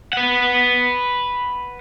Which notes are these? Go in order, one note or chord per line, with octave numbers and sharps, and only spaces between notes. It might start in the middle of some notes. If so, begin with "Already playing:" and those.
B4 F#5